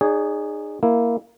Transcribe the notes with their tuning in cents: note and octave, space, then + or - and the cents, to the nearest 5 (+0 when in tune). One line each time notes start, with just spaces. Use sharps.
D#4 -35 G#4 -10 C#5 +40
A#3 +0 E4 +0